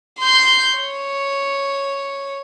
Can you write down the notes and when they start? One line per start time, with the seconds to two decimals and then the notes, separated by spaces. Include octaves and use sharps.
0.19 C6 G6
0.75 C#5